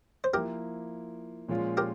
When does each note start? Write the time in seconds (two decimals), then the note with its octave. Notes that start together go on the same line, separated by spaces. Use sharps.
0.24 C5
0.33 F3 A#3 E4 G4 A#4
1.48 A#2 F3 G#3 C#4 F4
1.77 G4 A#4